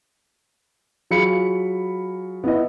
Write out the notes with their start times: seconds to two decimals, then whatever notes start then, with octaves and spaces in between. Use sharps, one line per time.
1.11 F#3 F4 G#4 B5 C#7
2.44 B3 E4 D#5